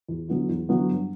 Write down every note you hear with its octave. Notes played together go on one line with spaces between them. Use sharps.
E2
D3 F#3 B3 E4
E2
D3 F#3 B3 E4
G2